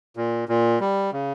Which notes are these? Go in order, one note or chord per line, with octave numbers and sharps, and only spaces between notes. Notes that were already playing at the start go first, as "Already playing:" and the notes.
A#2
A#2
G3
C#3